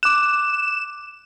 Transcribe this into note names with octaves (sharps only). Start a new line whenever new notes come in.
D6 F#6 E7